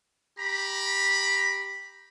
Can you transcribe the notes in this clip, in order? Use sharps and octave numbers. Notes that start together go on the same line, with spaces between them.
G4 A#5 B5